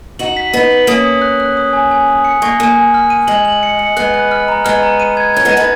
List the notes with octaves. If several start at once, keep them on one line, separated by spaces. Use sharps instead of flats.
D#4 F#4 F#7
B6
B3 D#4 B6
F#7
A#3 C#4 D#6
D#6
F#6
F#6
D#6
G#5
G#5
D#6
C#7
A#3 C#6
A#3 G#5
G#5
F6
D#7
G#3 F#7
F#7
C#7
C#7
G#3 B3 F#6
F#6
F6
A#5
G#3 B3 F6
A#5
D#7
G#6
C#4 G#6
G#3 B3
D#7
B3 D#4